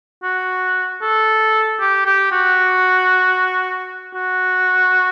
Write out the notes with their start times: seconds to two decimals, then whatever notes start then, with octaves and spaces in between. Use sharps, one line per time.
0.23 F#4
1.02 A4
1.80 G4
2.05 G4
2.32 F#4
4.14 F#4